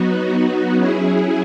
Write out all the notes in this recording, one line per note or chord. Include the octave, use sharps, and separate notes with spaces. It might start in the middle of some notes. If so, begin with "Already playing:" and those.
Already playing: F#3 B3 D#4 F#4
F#3 C#4 E4 G#4